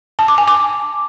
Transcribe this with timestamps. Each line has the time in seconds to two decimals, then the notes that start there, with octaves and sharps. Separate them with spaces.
0.19 A5
0.28 D6
0.38 G#5
0.48 D6